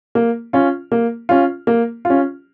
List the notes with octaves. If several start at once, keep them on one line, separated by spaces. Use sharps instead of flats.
A#3
C#4 F4
A#3
C#4 F4
A#3
F4
C#4